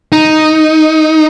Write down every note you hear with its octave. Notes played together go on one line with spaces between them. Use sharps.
D#4